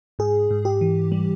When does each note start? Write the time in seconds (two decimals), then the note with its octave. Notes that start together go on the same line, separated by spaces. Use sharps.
0.19 G#2 G#4
0.51 G#2
0.65 G4
0.81 E3
1.12 G3